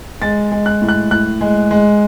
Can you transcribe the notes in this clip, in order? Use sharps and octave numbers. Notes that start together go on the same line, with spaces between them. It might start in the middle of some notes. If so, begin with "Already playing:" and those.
G#3 A6
G#3
F#6
A2
F#6
A2 F#6
G#3
G#3